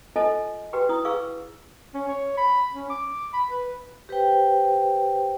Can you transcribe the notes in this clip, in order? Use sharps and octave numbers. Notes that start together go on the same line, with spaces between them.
F4 A4 C5 D#5 G#5 A5
F#4 G4 B4 G5
E4 D#6
G#4 B4 F5 C#6 D6 E6
C#4
C#5
B5
C#4
D6
B5
B4
G4 B4 C5 G5